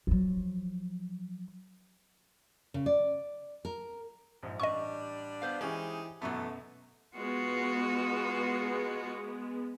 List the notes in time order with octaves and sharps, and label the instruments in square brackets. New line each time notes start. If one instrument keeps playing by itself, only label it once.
[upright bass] F3 F#3
[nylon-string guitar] C#3
D5
A#4
[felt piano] A#1 G#2
[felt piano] A1 [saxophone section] G3 D4 [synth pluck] D#5 C#6
[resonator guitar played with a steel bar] B3 C5 F5
[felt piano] E3 E4 C5 [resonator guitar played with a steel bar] G#3 C#4 [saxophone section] D#4 G4 G#4
[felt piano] F#2 B2 [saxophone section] D3 A3 [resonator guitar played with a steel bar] E3 F#3 B3
[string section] G#3 B3 [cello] F4 F#4